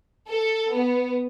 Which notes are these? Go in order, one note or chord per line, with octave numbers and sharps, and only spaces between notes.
A4
B3